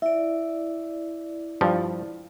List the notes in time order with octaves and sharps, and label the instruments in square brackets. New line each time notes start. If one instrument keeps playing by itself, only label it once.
[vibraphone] E4 D5 [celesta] E5
[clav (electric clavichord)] G2 F3